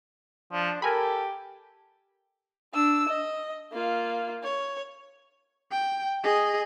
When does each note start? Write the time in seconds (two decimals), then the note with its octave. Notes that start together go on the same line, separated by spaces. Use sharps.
0.52 F3 D4
0.82 G4 A4 A#4 G#5 B5
2.74 D4 E6
3.09 D#5
3.72 A#3 F4
4.43 C#5
5.72 G5
6.24 G#4 D#5